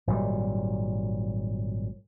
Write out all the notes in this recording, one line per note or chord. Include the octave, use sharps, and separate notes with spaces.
G#1 A#2 F#3 G3